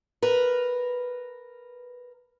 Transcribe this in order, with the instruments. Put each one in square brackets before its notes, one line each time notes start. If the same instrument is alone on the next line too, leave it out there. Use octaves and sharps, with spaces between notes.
[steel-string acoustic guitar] A#4 B4